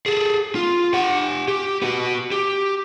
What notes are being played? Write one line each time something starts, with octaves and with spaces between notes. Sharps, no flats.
G#4 A4
F4
G4 F#5
G4
B3 F#4
G4